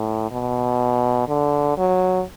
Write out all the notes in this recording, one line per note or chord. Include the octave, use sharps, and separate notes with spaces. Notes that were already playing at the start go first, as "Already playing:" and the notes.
Already playing: A2
B2
D3
F#3